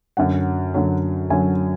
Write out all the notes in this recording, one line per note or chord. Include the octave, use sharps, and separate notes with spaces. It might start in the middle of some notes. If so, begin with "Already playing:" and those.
F#2 D3 F#3 F#5
F#2 D3 F#3
F#2 D3 F#3 G#5